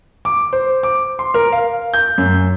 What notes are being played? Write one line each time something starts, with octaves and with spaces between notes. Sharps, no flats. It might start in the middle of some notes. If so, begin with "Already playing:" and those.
D6
C5
D6
C6
A#4
F5
G6
F#2